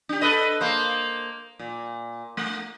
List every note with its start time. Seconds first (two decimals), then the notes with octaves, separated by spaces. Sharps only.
0.09 D4 G4
0.21 A4 B4 D#5
0.61 A#3 C5
1.59 A#2
2.37 A3